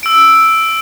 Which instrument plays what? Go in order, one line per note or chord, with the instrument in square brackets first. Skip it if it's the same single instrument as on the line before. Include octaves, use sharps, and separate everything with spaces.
[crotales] E6 D7